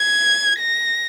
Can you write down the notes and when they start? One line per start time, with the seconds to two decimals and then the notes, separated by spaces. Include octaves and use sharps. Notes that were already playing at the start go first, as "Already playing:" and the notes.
Already playing: G#6
0.59 A#6